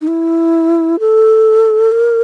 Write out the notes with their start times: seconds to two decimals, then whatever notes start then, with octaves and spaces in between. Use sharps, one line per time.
0.01 D#4
0.08 E4
1.00 A4
1.92 A#4